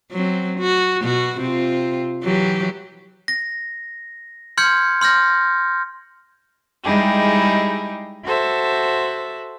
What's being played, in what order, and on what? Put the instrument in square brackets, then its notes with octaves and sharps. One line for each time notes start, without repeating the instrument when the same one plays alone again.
[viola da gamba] F#3 C4
F#4
B2 F#4
C3 C4 F4
E3 F#3 G4
[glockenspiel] A#6
C6 F6 G6 G#6 C#7
C6 F6 G6 A#6
[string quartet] G3 G#3 D#4 E4 G4 G#4
F#4 A4 C5 E5